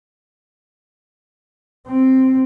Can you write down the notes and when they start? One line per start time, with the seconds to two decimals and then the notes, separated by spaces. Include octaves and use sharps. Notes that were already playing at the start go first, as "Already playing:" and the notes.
1.87 C4